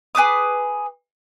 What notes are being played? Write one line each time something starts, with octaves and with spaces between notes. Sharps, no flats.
G#4 B4 D6 D#6